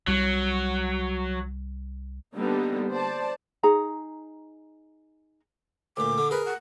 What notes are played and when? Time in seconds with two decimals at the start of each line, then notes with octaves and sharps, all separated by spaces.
0.07 C2 F#3 G3
2.35 D3 G3 A#3 B3 D4 D#4
2.89 C5 D5 A5
3.63 D#4 G#4 A#5
5.97 D2 A#2 D6
6.18 D3
6.31 G#4 A#4 B4
6.46 F#5